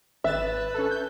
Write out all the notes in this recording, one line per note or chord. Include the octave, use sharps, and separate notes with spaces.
G#1 B4 E5 A6 E7
C#4 A4
G6